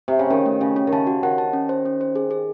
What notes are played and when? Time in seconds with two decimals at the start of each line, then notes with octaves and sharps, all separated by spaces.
0.08 C3
0.19 C#3
0.30 D#3 C#4
0.46 A3
0.61 C#3 C#4
0.76 C#4
0.87 D#3
0.92 C#3 A5
1.07 F#4
1.23 D#3 F#5
1.38 A5
1.53 C#4
1.69 C5
1.85 C#4
2.01 C5
2.16 G#4
2.31 G#4